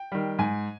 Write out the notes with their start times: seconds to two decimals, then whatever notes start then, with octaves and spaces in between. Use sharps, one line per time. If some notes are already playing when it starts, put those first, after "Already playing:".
Already playing: G5
0.12 D#3 G3
0.39 G#2 G#5